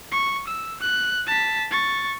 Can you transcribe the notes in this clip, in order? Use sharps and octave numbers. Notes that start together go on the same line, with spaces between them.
C#6
E6
F#6
A5 B6
C#6 A6